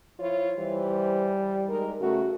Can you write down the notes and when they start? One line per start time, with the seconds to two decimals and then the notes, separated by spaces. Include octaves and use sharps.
0.20 F3 E4 F4 C#5
0.58 E3 G3 C5
1.69 G#3 D#4 A#4
2.01 C#3 A3 F#4